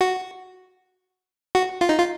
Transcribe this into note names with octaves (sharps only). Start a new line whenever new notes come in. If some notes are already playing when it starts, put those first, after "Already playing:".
F#4
F#4
F4
D#4
F4